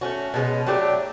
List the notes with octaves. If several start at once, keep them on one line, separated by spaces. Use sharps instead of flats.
A3 C#4 F#4
B2 G#3 C#4
F#3 A3 D4 G4